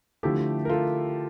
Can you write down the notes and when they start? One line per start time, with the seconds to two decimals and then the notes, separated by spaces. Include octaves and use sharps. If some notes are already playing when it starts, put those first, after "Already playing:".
0.23 D3 F3 A3 E4 G4
0.65 A#4
0.69 F4 A4